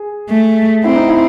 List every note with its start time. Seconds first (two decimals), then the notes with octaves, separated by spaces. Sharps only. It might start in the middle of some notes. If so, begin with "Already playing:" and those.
Already playing: G#4
0.29 A3
0.84 C4 E4
0.96 D#4
1.08 E4